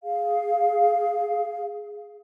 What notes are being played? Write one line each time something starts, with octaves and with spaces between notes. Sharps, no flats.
G#4 F5